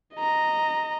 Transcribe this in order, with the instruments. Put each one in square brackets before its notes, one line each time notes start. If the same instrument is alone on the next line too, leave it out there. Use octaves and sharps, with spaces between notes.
[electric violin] D#5 A#5